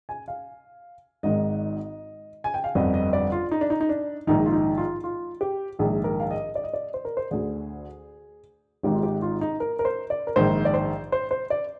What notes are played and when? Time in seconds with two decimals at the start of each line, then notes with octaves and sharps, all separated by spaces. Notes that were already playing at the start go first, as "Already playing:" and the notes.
0.09 G#5
0.28 F5
1.23 G#1 G#2 D#3 D#5
2.44 G#5
2.54 G5
2.64 F5
2.75 G1 F2 D3 D#5
2.94 D#5
3.13 D5
3.32 F4
3.51 D#4
3.61 D4
3.70 D#4
3.81 D#4
3.89 D4
4.27 A#1 G#2 D#3 D#4
4.46 F4
4.53 D#4
4.78 F4
5.04 F4
5.41 G4
5.79 A#1 G#2 D#3 G#4
6.04 A#4
6.20 F5
6.31 D#5
6.55 D5
6.64 D#5
6.73 D5
6.94 C5
7.05 A#4
7.17 C5
7.31 D2 D3 G#4
8.83 G#1 G#2 D#3 G4
8.95 F4
9.03 G4
9.22 F4
9.41 D#4
9.60 A#4
9.79 A#4
9.85 C5
10.10 D5
10.27 A#4
10.36 A#1 G#2 D#3 C5
10.65 D5
10.74 C5
11.12 C5
11.31 C5
11.50 D5